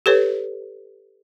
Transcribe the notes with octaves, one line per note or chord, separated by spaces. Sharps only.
G4 A4 B4 C#5